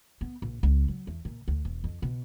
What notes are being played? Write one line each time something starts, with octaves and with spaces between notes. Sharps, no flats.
B3
A#1
C#2
F#3
E2
A#2
D2
E1
F2
B2